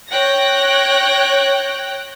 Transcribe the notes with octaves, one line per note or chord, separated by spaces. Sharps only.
C#5 G5 F#6 A#6